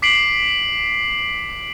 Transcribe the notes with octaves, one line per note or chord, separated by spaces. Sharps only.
D6 B6 C7 D7 F#7